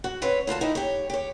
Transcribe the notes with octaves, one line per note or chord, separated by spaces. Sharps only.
F#4
C4 B4 C#5
D2 F4 F#4 A5
D#4 E4 G4
G4 C#5
G4 C#5